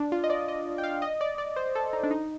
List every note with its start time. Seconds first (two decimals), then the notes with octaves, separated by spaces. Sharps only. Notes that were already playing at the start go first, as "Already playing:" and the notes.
Already playing: D4
0.12 F4
0.24 D#5
0.30 D5
0.48 D#5
0.78 G5
0.83 F5
1.02 D#5
1.21 D5
1.38 D5
1.56 C5
1.75 A4
1.93 D#4
2.03 D4
2.11 D#4